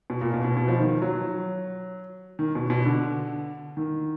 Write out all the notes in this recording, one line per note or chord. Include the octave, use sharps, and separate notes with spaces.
B2
A#2
B2
B2
B2
F3
D#3
F#3
D#3
B2
B2
D3
D#3